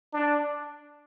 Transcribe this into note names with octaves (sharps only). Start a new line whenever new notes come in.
D4